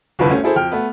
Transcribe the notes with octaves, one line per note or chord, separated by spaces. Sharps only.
G1 C2 F2 D3 E4 B4
A3 C#4 C5
E4 G#4 A4 C5
F2 G5 F6
A3 B3